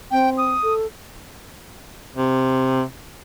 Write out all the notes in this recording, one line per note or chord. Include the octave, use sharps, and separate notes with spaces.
C4 G5
D#6
A4
C3